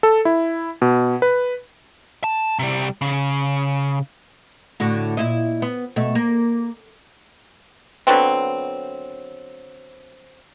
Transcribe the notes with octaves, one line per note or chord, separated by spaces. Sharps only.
A4
E4
B2
B4
A5
C3 G3
C#3
A2 D3 F#4
A#2 E4 D#5
B3
B2 A3
A#3
D3 F#3 B3 C4